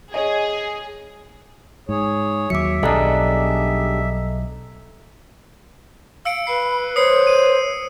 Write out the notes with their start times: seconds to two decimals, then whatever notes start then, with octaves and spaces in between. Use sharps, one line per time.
0.14 G#4 C#5 D#5
1.89 G#2 G#4 C#5
2.50 D#2 F#3 E5 D6 C#7
2.83 B1 G3 D4 G#4 A4 D#5 A#5
6.25 F5 E6 C#7 D7
6.47 B4 B5 C7
6.96 C5 C#5 D#6 C7 C#7
7.27 D#7